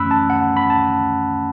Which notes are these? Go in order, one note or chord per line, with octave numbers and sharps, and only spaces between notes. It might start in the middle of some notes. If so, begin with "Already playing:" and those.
Already playing: F#2 E3 A3 C#4 B5 E6 F#6
A5
F#5
B5
A5